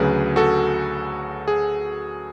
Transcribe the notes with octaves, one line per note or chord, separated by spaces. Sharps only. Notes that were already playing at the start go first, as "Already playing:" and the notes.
Already playing: D2 C#3 F#3 G#4 B4
F#4 A4
G#4